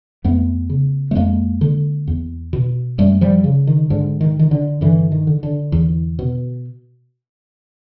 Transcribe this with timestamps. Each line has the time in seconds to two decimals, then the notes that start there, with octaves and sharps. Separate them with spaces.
0.24 F2 A3 B3
0.70 C#3
1.11 A3
1.15 F2 G#3 A#3
1.61 D3
2.07 E2
2.53 B2
2.98 F#2 G3 A3
3.21 F3 G3
3.44 C#3
3.67 D#3
3.90 G#2 D3
4.21 D#3
4.39 D#3
4.51 D3
4.81 G2 D3 E3
5.12 D#3
5.27 D3
5.43 D3
5.72 E2
6.19 B2